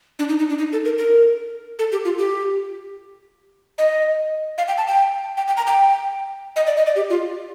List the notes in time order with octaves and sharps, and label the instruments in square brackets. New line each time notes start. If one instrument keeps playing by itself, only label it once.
[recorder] D4
D#4
D#4
D4
D#4
A4
A#4
A#4
A4
G4
F4
G4
D#5
F5
G5
A5
G5
G5
G5
A#5
G5
D#5
D5
D#5
D5
G4
F4